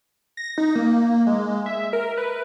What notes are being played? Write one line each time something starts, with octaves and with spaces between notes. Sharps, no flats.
A#6
D#4
A#3
G#3
E5
A#4
B4